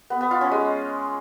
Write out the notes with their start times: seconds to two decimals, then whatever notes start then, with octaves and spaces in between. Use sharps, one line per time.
0.10 B3
0.21 B3
0.31 F4
0.41 C#4
0.51 G#3